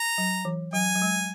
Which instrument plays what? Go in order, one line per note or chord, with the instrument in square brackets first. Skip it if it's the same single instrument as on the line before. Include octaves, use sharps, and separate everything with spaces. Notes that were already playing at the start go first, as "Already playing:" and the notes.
Already playing: [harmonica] A#5
[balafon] F#3
E3
[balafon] F#3 [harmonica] G#5
[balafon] F#3
G#3